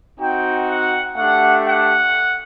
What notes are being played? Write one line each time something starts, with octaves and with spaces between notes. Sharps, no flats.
C4 D#4 F#4 G5
F#5
A3 D4 G4 F#5
F#5